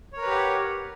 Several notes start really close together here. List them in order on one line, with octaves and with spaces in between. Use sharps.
C#5 A#4 B4 G4 F#5